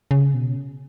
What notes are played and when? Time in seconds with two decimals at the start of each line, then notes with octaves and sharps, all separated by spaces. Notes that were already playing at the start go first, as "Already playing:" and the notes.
0.11 C#3
0.34 B2